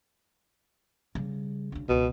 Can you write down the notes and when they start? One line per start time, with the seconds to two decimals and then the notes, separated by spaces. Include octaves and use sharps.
1.15 C#3 G3
1.72 D2 C#3
1.89 C#2 B2